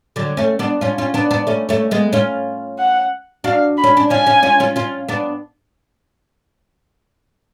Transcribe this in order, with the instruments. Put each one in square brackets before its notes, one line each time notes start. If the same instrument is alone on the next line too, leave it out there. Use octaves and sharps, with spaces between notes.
[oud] D3 F#3
A3 C#4
B3 D4
C#4 F4
C#4 F4
B3 D4
B3 D4
A3 C#4
A3 C#4
G#3 B3
C#4 F4
[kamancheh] F#5
[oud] D4 F#4 [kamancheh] F5
[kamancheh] B5
[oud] C#4
D4
[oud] C#4 F4 [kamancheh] G#5
[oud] C#4 F4
C#4 F4
C#4 F4
C#4 F4
B3 D4